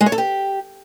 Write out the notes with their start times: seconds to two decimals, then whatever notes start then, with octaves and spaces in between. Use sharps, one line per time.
0.01 G#3
0.06 C#5
0.12 A4
0.18 G4